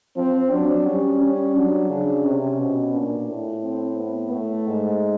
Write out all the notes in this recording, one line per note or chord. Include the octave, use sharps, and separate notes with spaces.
F3 C4
F#3 D4
G3 C#4
C#4
F#3 D4
C#3 D4
C3 C#4
B2
A#2 D4
A2
C4
B3
A2 A3
G#2